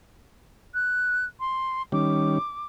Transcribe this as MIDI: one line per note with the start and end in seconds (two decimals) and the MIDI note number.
0.74 1.25 90
1.40 1.82 84
1.92 2.38 51
1.92 2.38 55
1.92 2.38 61
1.92 2.67 86